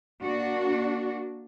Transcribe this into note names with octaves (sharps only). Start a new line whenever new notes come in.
A#3 D4 F#4